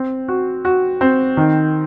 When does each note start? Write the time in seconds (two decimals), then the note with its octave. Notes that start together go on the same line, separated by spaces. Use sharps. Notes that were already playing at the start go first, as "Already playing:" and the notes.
Already playing: C4
0.28 F#4
0.65 F#4
1.01 C4
1.37 D#3